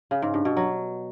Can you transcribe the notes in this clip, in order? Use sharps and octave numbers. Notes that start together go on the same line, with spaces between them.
C#3
G#2
G2
B2
F#3